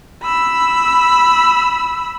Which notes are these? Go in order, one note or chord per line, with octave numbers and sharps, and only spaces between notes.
B5 E6